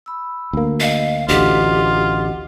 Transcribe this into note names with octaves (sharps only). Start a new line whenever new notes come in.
B5 E6
D2 A#3
D#5 F5
A1 D2 F4 G4 D#5 F#5